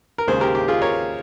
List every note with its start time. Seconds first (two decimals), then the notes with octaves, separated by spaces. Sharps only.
0.18 A#4
0.28 D#2 C#3 G#3 G#4 C5
0.41 G4 A#4
0.55 G4
0.68 F4 G#4
0.82 A#4 C#5